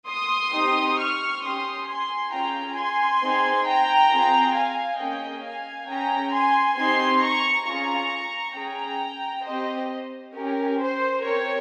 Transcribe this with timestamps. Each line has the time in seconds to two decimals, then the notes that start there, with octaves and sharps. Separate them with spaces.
0.09 C6 D#6
0.54 C4 D#4 G4
0.98 C#6 F6
1.43 C#4 G4 C6 D#6
1.87 G#5 C6
2.32 C#4 F4 G#4 G5 A#5
2.77 G#5 C6
3.21 C4 D#4 G#4
3.66 G5 A#5
4.10 C4 F4 G#4
4.55 F5 G#5
4.99 A#3 C#4 G#4 D#5 G5
5.44 F5 G#5
5.88 C#4 G#4 G5 A#5
6.33 G#5 C6
6.78 C4 D#4 G4 G#5 C6
7.22 A#5 C#6
7.67 C#4 F4 G#4 A#5 C#6
8.56 C#4 G#4 G5 A#5
9.46 C4 G4 C5 D#5
10.35 C#4 G4 A#4
10.80 C5
11.24 C4 G4 A#4 C#5